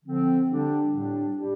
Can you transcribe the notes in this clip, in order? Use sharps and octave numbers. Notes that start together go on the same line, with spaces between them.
D3 F3 C4
D3 G3 D4 G4
A2 G3 D4 G4
G3 D4 G4